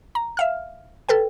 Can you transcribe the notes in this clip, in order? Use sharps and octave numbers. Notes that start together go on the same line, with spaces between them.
A#5
E5 F5 F6
A4 B4 G5